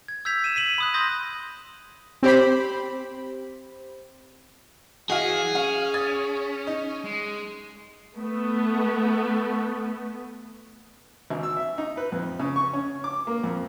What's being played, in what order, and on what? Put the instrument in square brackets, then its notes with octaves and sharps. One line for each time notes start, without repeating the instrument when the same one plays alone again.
[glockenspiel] G#6
E6 G6 G#6 B6 F7
D#7 E7
B6 D#7 F#7
B5 D#6 F#6
C6 D#6 G6 A#6
[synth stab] C4 G4 C5 B5
[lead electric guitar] E3 E4 [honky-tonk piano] F#4 D#5 F5 [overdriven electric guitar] G#4
[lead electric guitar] C#4 [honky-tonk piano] F5
[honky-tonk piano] D#6 G#6 A6
D#4
[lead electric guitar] G#3
[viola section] A3 B3
[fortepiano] G#1
E6
E5
D#4
B4
F2
C#3
C#6
C#4
D6
A#3
F2